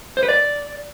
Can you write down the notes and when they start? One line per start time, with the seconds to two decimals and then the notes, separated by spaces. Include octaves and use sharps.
0.17 C5
0.23 B4
0.29 D5